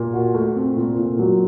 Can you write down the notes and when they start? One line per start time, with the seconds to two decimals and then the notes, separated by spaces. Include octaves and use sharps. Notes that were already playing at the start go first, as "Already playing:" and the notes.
Already playing: A#2
0.14 F#4
0.34 A3
0.56 C4
0.76 A#2
0.98 A#2
1.19 F#3